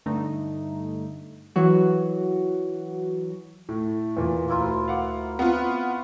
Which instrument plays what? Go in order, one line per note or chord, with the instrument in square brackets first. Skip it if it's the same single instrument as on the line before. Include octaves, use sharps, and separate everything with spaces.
[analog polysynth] G2 D3 A3 D#4
[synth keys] E3 F#3 F#4
[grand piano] A2 [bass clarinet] A3
[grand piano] E2 A#2
[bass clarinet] D2 [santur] A#3 E4 F4
[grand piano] F5 F#5 D6
[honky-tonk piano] B3 F4 [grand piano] C4 [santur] B4 C#6